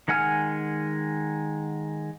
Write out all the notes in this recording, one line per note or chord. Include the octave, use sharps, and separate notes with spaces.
D#3 G#3 F#5 G#5 F6